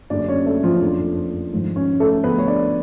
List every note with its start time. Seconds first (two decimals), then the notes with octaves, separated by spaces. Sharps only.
0.10 F#1 F#2 D3 D4 D5
0.28 C#4 C#5
0.46 A3 A4
0.63 F3 F4
0.74 C#4
0.81 F#1 F2 C#3 F3 D4
1.53 G#1 G#2 F3
1.76 C#4
2.00 A3 A4
2.24 D2 C#3 F3 B3 B4
2.38 C#5
2.48 D4 D5